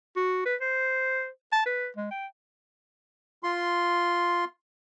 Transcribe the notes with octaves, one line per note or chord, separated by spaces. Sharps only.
F#4
B4
C5
A5
B4
G#3
G5
F4 C6